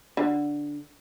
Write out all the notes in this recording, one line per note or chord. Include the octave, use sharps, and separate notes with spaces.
D3